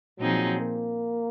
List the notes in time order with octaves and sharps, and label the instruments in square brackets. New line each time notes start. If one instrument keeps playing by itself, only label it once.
[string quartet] A#2 F3 C4 D#4 G#4 [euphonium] F#3
[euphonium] A#3